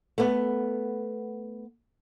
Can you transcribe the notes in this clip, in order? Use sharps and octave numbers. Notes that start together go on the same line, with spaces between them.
A3 B3